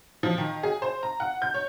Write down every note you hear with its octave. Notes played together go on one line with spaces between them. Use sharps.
F3
D#3
G#4
C5
A#5
F#5
G6
C#5